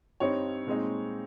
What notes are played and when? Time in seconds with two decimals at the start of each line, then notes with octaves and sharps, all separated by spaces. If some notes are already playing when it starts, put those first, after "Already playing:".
0.20 G2 G3 C4 D#4 C#5
0.66 A#2 G#3 C4 D#4